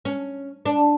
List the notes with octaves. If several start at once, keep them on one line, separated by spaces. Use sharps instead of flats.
C#4
D4